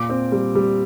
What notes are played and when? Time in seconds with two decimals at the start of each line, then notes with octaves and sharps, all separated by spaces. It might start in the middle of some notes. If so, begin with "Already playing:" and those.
Already playing: A#2 D6
0.10 C4
0.32 G3
0.55 G3